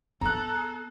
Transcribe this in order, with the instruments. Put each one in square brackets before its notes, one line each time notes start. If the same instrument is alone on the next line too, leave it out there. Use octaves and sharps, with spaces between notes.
[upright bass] B3 [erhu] A4 [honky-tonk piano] A#5 F#6